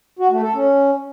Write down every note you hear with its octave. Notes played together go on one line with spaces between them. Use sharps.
F#4
A3
A4
C#4